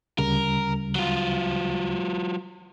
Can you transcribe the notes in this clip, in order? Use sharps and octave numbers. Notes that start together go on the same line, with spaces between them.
D2 C#3 G3 A#4
F#3 F4